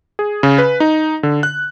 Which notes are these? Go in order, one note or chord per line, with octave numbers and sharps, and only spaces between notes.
G#4
C#3
B4
D#4
D3
F#6